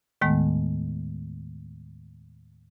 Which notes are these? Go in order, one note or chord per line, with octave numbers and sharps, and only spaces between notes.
D#2 A2 D#3 G#3 A3 B3